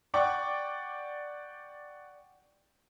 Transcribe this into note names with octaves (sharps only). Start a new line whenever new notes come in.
D5 F#5 G5 C#6 D6